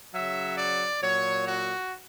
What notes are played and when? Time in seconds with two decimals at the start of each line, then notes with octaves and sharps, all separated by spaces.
0.13 C#3 F#3 E5
0.58 D5
1.02 A#2 F#3 C#5
1.46 F#4